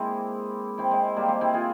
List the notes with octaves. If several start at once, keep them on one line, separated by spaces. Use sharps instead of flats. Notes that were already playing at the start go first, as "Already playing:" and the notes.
Already playing: G#3 A#3 C4 E4
C4 E4
G#3 C4
G3 A#3
G#3 C4
C4 E4
F4 G#4